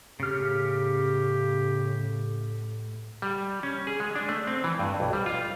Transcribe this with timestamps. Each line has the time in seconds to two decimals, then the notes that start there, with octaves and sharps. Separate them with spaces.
0.20 A2 C#3 G4 F6
3.22 G3
3.63 C#4
3.87 G#4
4.00 G#3
4.16 D4
4.29 A3
4.47 C4
4.64 E3
4.79 G2
5.00 B1
5.13 G3
5.26 F4